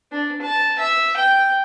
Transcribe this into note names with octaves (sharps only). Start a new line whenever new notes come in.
D4
A5
E5
G5